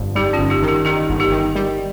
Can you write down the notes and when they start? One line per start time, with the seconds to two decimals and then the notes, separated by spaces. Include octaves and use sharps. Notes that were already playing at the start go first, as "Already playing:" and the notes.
Already playing: G1 F2
0.15 G3 D#4 G4
0.33 C#4 F4
0.39 G1
0.50 D#4 G4
0.63 D#3
0.68 D#4 G4
0.85 D#3 D#4 G4
1.09 G1
1.20 D#4 G4
1.32 D#3
1.55 G3